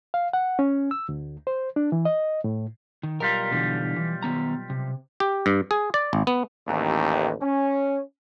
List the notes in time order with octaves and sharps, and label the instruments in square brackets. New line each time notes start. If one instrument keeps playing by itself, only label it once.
[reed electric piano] F5
F#5
C#4
E6
D2
C5
D4
E3
D#5
A2
[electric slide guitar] D#3
[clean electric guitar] B1 G3 F4 [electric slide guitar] A#4
[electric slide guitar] B2 D3 E3
E3
D#3 B3 A#5
C3
[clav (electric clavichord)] G4
G2
G#4
D5
G#1
B3
[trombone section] A1 D#2
C#4